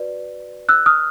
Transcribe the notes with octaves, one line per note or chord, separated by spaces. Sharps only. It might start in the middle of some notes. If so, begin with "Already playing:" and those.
Already playing: F#4 B4 D5
E6 F#6
D#6 F6